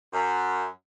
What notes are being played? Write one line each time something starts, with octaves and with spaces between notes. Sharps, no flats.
F#2